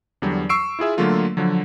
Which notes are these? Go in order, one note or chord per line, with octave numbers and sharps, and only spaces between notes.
E2 D3 F#3 G3
C#6 E6 C7 D7
E4 F4 G#4 E5
D3 F#3 A3 A#3 F4 A4
D3 F3 F#3